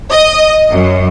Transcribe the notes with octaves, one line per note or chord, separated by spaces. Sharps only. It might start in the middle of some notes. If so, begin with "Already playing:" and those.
D#5
F#2